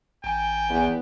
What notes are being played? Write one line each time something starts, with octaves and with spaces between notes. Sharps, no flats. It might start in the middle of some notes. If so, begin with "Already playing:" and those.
A1 G5 G#5
E2 B3